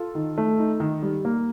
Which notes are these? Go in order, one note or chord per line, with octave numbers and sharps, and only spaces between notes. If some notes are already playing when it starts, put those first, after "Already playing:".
Already playing: F4 A4
D#3
A3
D#4
D#3
G3
A#3